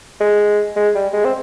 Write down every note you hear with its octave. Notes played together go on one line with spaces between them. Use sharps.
G#3
G#3
G3
G#3
C4